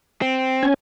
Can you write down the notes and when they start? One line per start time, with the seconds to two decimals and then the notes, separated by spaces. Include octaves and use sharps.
0.22 C4
0.63 C#4 G#5